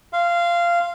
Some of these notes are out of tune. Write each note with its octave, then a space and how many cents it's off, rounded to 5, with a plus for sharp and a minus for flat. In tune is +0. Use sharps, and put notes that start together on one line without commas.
F5 -15 C6 +0